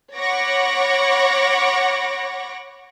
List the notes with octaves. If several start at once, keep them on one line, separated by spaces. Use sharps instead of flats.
C#5 F#5 B5 C#6 D6 A#6